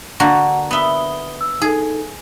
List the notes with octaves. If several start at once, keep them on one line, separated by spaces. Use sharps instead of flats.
D3 A#3 F#4 F#5
B3 E5 D#6 G7
E6
D#4 G#4 A4